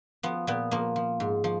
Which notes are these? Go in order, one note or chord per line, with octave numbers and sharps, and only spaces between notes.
F3 B3
A#2 B3
F3 A#3
F3
G#2
F3